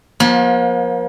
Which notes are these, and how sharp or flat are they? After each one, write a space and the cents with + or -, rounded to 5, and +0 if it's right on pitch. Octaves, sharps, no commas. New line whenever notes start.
F3 +30 A#3 +45